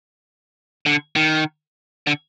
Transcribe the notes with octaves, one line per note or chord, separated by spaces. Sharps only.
D3
D#3
D3